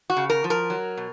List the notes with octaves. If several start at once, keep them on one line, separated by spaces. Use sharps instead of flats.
F#4
C#3
A#4
F3
A#4
F#3
B2